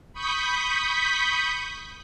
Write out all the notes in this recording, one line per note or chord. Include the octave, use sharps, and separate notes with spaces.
B5 C#6 D#6 G6 B6